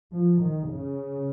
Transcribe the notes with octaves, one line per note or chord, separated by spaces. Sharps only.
F3
D#3
C#3